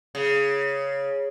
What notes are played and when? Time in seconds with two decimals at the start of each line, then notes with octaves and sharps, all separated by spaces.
0.15 C#3